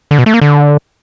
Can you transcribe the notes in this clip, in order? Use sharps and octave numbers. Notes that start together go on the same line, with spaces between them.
D3
B2
A3
A#3
D3